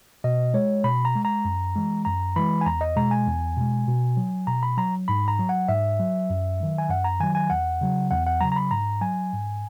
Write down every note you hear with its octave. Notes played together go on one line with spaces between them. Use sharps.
B2 D#5
G#3 C#5
B2 B5
A#5
G#3
A#5
F#2
E3 G#3
F#2 A#5
E3 G#3 B5
G#5
E2 A#5
D#5
B2 G#3 A#5
G#5
E2
B2 G#3
B2
F#3
B2 A#5
B5
F#3 A#5
G#2 B5
A#5
F#3
F#5
G#2 E5
F#3
F#2
D#3 F#3
G#5
F#2 F#5
A#5
D#3 F#3 G#5
G#5
E2 F#5
C#3 F#3
E2 F#5
F#5
C#3 F#3 A#5
A#5
B5
G#2 A#5
F#3 G#5
G#2